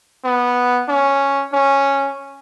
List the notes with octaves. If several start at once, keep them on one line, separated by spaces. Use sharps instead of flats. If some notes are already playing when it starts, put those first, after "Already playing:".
B3
C#4
C#4